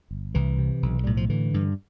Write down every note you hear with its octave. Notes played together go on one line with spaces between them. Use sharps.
G1
C2 E3
C3
B1
A2 G3
F3
D3 E3
G2